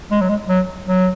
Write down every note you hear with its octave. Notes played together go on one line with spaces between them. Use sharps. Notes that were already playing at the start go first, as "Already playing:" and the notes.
G#3
F#3
G#3
F#3
F#3